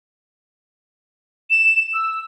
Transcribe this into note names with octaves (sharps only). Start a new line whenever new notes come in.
E7
E6